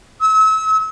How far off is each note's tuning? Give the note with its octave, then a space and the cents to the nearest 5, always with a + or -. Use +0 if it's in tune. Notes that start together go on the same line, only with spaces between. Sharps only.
E6 -35